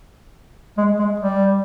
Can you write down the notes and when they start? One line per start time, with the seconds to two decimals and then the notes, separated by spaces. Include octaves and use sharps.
0.78 G#3
0.99 G#3
1.20 G3